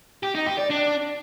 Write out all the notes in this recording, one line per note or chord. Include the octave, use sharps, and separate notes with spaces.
G4
D#4
G4
D5
D4